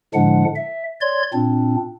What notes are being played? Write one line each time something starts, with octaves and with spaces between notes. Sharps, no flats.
A2 D3 F3 G#3 D4 F#5
E5
C#5 D5 C6 G#6
A#2 C4 D4